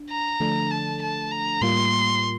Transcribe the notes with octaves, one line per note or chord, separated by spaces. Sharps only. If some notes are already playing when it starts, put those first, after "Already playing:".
Already playing: D4
A#5
D3 F3 A3 D4 A4
A5
A5
A#5
A2 G3 A#3 F4 C6